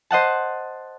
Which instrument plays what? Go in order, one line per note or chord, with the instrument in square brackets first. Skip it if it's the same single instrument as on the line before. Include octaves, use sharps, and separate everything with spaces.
[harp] C5 D#5 F#5 A5